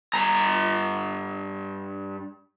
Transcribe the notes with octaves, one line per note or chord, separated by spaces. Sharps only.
G2 A#5